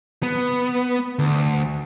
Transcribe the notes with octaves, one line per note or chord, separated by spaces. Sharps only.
B3
D2